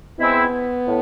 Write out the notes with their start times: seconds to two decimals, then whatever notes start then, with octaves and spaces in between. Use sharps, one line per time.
0.20 G#3 B3 C4 E4
0.86 A2